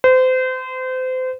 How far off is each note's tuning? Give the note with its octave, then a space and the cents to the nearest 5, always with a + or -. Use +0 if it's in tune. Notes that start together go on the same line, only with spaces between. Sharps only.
C5 -30